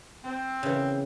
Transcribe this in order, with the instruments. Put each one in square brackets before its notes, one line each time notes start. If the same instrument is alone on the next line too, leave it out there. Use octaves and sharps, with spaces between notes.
[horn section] C4
[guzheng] C#3 E3